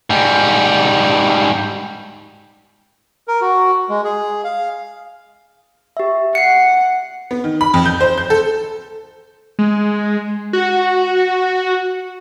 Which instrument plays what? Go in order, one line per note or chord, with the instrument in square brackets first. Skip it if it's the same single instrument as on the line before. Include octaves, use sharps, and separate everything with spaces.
[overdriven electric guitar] G#2 G3
[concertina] A#4
F#4
G#3
G#4
F5
[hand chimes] G4 E5
[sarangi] F#5 [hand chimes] C7 C#7
[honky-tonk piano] B3
D#3
B5
F2
G6
C5
G6
A4
[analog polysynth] G#3
F#4